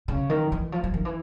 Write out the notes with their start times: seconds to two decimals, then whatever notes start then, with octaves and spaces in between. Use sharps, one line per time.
0.08 C#3
0.30 D#3
0.52 E3
0.72 F3
0.84 F3
0.94 D#3
1.05 E3